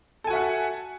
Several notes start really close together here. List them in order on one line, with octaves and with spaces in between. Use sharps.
A4 G#5 F#4 E5 F#5